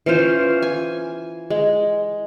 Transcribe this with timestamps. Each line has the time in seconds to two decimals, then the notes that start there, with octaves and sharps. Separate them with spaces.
0.06 E3 C#4 F4 C5
0.62 G#5
1.50 G#3